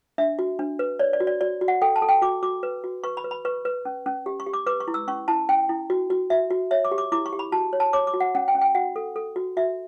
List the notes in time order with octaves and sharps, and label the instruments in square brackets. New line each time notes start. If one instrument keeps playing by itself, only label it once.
[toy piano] D4 E5
F#4
D4
B4
C#5 D5
D5
F#4
D5
F#4 D5
F#4
F#5
A4 G5
A5
A4
G5
F#4 D6
F#4 D6
B4
F#4
B4 C#6
B5
B4
B5
B4 C#6
B4
C#4
C#4
G4
C#6
G4
D6
B4 D6
C#6
E4
E6
C#4 C#6
E4 A5
C#4 G5
E4
F#4
F#4
F#4 E5
F#4
C#5 E5
D6
G4
D6
E4 D6
C#6
G4
B5
F#4 A5
C#5
A5
C#5 D6
D6
F#4
F#5
C#4 F#5
G5
C#4
G5
F#4 F#5
A4
A4
F#4
F#4 E5